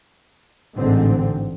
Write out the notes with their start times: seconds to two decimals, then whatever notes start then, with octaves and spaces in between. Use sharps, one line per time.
0.76 A1 G#2 D3 C4